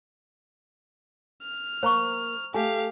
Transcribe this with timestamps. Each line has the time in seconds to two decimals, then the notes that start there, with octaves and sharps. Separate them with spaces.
1.43 F6
1.83 A#3 C5 A#5 C#6
2.54 A3 G4 A4 F5 G#5